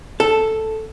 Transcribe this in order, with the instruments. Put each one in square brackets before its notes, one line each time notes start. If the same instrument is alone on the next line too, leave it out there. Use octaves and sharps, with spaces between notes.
[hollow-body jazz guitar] A4